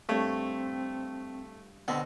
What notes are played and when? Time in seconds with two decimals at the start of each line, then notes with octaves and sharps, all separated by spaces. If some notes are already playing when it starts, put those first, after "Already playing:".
0.09 G2 A3 C4 C#5
1.88 B2 D3 B3 C4